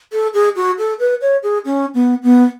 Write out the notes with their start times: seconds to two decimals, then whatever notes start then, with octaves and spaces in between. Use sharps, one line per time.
0.12 A4
0.34 G#4
0.56 F#4
0.78 A4
0.99 B4
1.21 C#5
1.43 G#4
1.65 C#4
1.94 B3
2.23 B3